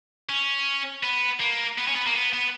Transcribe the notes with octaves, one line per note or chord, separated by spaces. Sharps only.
C#4
B3
A#3
B3
C#4
B3
A#3
B3
B3